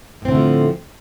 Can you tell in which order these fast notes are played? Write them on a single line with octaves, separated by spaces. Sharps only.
A2 C4 D3 A3 F3